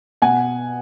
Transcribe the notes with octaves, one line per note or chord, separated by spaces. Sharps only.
B2 F#5 G#5